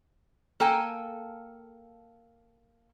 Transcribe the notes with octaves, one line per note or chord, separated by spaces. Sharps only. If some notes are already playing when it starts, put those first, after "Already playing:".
A#3 A4 G5 G#5